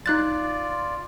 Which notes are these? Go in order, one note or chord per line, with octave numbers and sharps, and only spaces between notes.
D#4 F4 D5 F#6 A6